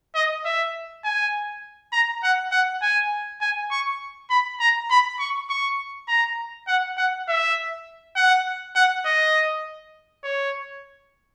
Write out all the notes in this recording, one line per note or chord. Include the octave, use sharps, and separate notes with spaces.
D#5
E5
G#5
A#5
F#5
F#5
G#5
G#5
C#6
B5
A#5
B5
C#6
C#6
A#5
F#5
F#5
E5
F#5
F#5
D#5
C#5